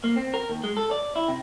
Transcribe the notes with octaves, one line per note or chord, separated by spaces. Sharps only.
A#3
C4
A#4
D#2
G#3
A4
D5
E4
C3